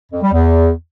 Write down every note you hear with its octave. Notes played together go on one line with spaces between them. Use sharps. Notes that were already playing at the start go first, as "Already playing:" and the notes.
F2
G3
E2